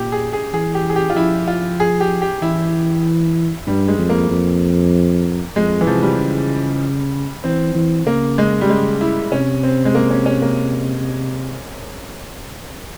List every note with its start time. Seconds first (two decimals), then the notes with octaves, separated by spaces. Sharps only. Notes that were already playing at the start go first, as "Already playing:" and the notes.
Already playing: A#2 G4
0.12 G#4
0.33 G#4
0.53 E3 G#4
0.75 G4
0.90 G#4
0.96 G4
1.10 F4
1.16 F3 E4
1.48 F4
1.80 G#4
2.00 G4
2.21 G4
2.42 E3 E4
3.67 G2 G3
3.88 G#3
3.99 F2
4.10 A#3
4.30 F2
5.56 F2 G#3
5.81 E3
5.87 C3 F3
6.03 G3
6.19 C#3
7.44 E3 C4
7.75 E3
8.06 C#3 A#3
8.38 G#3
8.61 G3
8.69 G#3
9.01 E4
9.32 C3 C#4
9.63 C4
9.85 G#3
9.95 A#3
10.11 C#4
10.26 C#4
10.42 A#3